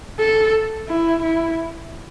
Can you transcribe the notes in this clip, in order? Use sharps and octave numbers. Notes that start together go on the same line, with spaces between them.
A4
E4
E4